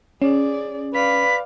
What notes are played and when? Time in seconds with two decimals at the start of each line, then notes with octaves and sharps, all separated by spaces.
0.22 C#4 G#4 D5
0.94 B4 D5 F5 B6